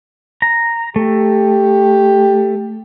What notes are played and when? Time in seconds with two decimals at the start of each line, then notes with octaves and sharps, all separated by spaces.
0.42 A#5
0.96 A3 G4